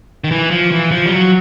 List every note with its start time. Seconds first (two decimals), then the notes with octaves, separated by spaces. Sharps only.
0.24 D#3
0.31 E3
0.51 F3
0.72 E3
0.91 F3
1.06 G3
1.10 F#3